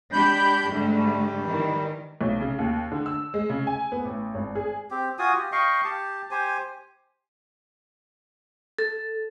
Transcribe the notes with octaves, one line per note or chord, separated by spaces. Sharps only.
G#3 D4 G4 B5 G6
G#2 D3 G3 A3
D#3 E3
B1
C#3
D#2
D3
E6
G#3
C#3
G#5
B3
A1
G#1
G#4
C4 G4
F4 F#4 G#5 D#6
G4
D#5 F5 G5 C#6
G4 A5
G4 C5 G#5
A4